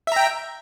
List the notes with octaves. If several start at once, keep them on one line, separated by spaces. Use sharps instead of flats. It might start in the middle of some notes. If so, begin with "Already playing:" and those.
E5 G5 A#5